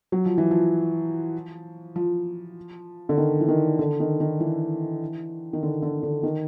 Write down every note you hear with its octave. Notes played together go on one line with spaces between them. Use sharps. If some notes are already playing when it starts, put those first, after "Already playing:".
F#3
F3
E3
F3
F3
D3
D#3
E3
D#3
D3
D#3
D#3
E3
D#3
D3
D3
D3
D#3